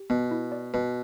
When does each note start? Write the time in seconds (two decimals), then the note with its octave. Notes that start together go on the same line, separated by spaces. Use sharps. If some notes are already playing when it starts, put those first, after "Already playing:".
Already playing: G4
0.10 B2 B3
0.31 E4
0.52 D5
0.74 B2 B4